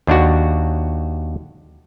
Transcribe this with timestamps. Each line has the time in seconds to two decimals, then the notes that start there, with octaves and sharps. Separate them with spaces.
0.07 D#2 D4 F#4